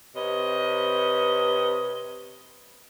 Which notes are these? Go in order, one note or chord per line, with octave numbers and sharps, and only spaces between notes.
C3 B4 C#5 D#5